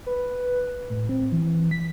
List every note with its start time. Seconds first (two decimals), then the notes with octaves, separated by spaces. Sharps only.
0.07 B4
0.90 A2
1.09 C4
1.32 E3
1.71 B6